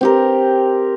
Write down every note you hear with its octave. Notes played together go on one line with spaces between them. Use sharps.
C4 G4 A#4